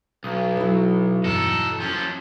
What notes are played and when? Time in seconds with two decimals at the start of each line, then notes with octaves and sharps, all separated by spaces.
0.24 B1 D#6
0.57 F#3 E4
1.24 E2 G2 B2 D#4 A4
1.80 F3 C#4